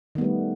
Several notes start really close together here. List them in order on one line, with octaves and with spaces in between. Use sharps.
D#3 B3 G3 A3